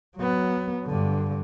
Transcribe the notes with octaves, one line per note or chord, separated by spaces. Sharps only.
F#3 B3
G2 D3